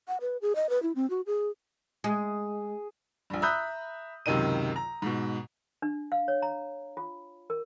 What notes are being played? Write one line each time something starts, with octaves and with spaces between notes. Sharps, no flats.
F#5
B4
G#4
D#5
B4
E4
C4
F#4
G#4
G#3 G#4
A#1 G2
E5 A#5 B5 D#6 F#6 G6
C#2 F#2 C3 D#3 D#4 D#7
A#5
G#2 B2
D4
F5
C#5
A#5
F4
A#4